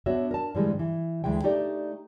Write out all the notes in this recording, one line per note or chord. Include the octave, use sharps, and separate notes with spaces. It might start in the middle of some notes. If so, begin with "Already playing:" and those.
B3 D4 F#4 C#5 E5
A#4 A5
G#2 D3 E3 G3 G#3
E3
D2 E3 G#3 G5
A3 D#4 G4 A4 D5